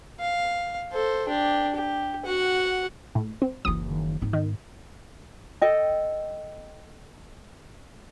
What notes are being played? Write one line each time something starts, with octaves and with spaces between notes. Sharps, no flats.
F5
A4 C5
D4 G4
G4
F#4 F#5
A2
C4
F#1 E3 D#6
D#3
G#2 B3 D#4
D#3
A4 D#5 G5